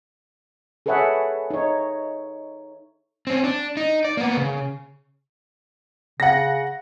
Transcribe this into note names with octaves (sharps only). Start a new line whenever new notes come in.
G#4 A4 B4 C#5 E5 F#5
D#4 C#5
C4 C#4
D4
D#4
D5
A#3 B3
C#3
C#3 F#5 A#6